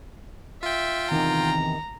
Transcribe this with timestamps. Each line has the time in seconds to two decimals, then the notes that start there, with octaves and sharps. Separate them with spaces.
0.63 F4 E5 G5
1.11 E2 C3 D#3 E3 A#5